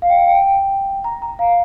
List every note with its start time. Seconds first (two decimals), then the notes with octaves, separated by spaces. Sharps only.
0.02 F5
0.10 G5
0.18 F5
0.27 G5
1.04 A#5
1.22 A#5
1.39 F5